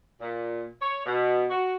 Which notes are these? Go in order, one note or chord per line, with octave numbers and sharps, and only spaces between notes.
A#2
C#5
B2
F#4